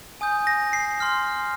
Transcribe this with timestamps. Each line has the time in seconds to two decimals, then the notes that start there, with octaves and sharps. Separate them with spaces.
0.21 G#5 D#6 G6
0.47 A#6
0.73 C7
1.00 C6 F6